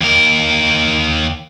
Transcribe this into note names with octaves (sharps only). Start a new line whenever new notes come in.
D#2 A#4